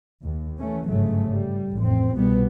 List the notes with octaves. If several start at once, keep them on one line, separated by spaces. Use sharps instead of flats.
D#2
E3 A3 C#4
G1 G#2 C#3 F#3 A3
G3
A1 F2 C4
C2 B2 G3 B3